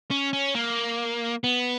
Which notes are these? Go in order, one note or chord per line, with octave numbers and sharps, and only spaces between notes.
C#4
C#4
A#3
B3